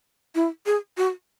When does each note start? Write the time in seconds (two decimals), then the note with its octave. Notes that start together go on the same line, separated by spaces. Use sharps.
0.35 E4
0.66 G#4
0.97 F#4